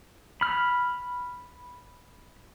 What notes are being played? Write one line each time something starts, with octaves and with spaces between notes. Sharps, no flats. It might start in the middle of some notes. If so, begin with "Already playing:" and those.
B5 F6